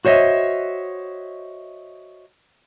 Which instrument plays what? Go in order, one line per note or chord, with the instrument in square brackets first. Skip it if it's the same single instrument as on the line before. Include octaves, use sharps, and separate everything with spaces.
[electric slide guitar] F#4 C5 C#5 D#5 E5